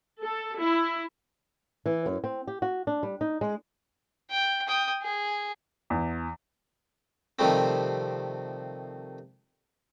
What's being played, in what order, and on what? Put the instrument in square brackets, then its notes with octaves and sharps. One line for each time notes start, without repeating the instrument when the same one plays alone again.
[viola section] A4
E4
[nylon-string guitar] E3
F#2
C4
G4
F#4
D4
G3
D#4
G#3
[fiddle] G5
G5 D#6
G#4
[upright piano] E2
[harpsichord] C3 D#3 F3 G3 A3 C4